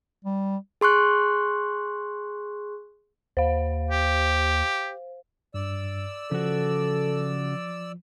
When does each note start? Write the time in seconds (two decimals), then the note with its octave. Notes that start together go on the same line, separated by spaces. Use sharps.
0.25 G3
0.81 G#4 C6 C#6 F#6
3.37 D#2 C5 F5
3.91 G4
5.54 G2 D5 E6
6.31 C#3 F3 F#4 A4